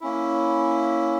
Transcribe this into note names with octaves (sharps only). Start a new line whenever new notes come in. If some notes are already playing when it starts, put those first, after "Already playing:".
A#3 C#4 E4